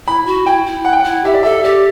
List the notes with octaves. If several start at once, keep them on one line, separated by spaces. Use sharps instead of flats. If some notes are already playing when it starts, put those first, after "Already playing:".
E4 B5
F#4
E4 G5
E4
F#5
G5
E4 F#5
G4 E5
D5
A4 E5
G4 D5